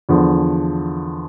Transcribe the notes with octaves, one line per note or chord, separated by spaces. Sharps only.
E2 D3 F3